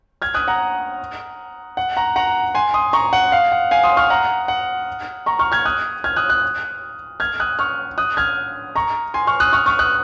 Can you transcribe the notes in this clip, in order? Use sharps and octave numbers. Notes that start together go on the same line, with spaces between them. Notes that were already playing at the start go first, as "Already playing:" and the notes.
F6 G#6
D#6 F#6
F#5 A#5
F#5
F#5 A#5
F#5 A#5
G#5 C6
C6 D#6
A#5 C#6
F#5
F5
F#5
F5 G#5
C6 D#6
C#6 F6
F#5 A#5
F#5
A#5 C#6
C#6 F6
F6 G#6
D#6 F#6
F6 G#6
D#6 F#6
D#6 F#6
F6 G#6
D#6 F#6
C#6 F6
D#6 F#6
F6 G#6
A#5 C#6
G#5 C6
C#6 F6
D#6 F#6
C#6 F6
C#6 F6
D#6 F#6